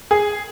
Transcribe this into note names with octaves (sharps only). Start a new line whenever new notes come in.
G#4